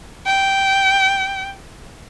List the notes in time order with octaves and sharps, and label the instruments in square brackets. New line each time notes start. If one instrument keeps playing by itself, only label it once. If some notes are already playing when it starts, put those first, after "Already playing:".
[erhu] G5